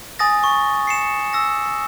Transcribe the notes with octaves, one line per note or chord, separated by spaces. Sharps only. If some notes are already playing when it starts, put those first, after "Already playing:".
G#5 D#6 A6 A#6
C#6
C7 C#7 E7
E6 A#6